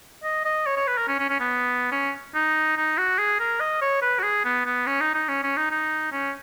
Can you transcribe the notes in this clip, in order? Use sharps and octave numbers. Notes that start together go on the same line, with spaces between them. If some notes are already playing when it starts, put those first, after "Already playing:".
D#5
D#5
C#5
C#5
B4
A#4
C#4
C#4
C#4
B3
C#4
D#4
D#4
F#4
G#4
A#4
D#5
C#5
B4
F#4
G#4
B3
B3
C#4
D#4
D#4
C#4
C#4
D#4
D#4
C#4